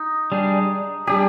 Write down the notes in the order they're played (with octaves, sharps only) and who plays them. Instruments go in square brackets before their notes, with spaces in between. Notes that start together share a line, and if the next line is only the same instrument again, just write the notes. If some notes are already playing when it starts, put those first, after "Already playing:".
Already playing: [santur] D#4
[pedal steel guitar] G3 D4 G#4
[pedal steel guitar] G3 D4 G#4 [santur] G4